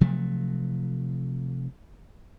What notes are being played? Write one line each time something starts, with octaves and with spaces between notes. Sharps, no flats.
C3 F3 F#3 A3